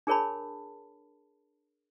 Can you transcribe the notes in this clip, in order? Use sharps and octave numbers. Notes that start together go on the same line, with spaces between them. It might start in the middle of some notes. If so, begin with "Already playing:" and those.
D4 G#4 A#4 C#5 A5 B5